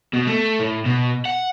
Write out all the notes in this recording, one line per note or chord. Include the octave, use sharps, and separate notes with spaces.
B2
A3
A2
B2
F#5